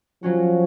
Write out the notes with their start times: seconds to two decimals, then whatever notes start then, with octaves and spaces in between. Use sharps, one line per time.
0.23 F3 F#3 C#4 F#4